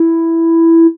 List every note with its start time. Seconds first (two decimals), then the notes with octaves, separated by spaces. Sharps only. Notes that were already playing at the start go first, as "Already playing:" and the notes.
Already playing: E4